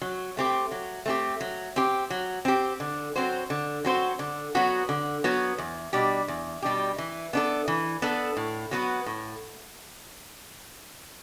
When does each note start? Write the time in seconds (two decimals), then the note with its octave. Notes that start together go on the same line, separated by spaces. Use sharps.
0.01 F#3
0.37 A3 C4 G4
0.71 F#3
1.06 A3 C4 G4
1.41 F#3
1.76 C4 G4
2.10 F#3
2.45 C4 G4
2.80 D3
3.16 F#3 C4 F#4 C5
3.50 D3
3.85 F#3 C4 F#4 C5
4.19 D3
4.55 F#3 B3 F#4
4.89 D3
5.24 F#3 B3 F#4
5.58 E2
5.93 B2 G3 D4 G4
6.28 E2
6.62 B2 G3 D4 G4
6.98 E3
7.33 B3 D4 A4
7.68 E3
8.02 B3 D4 A4
8.37 A2
8.71 F#3 B3 F#4 B4
9.06 A2